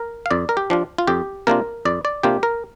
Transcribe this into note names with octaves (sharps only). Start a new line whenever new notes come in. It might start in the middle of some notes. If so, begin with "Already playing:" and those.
Already playing: A#4
F5
F2 D5
A#4
G4
F3 D4 F4
F4
F2 G4
C3 A#3 D4 F4 A#4
F2 D5
D5
C3 A#3 D4 F4 G4
A#4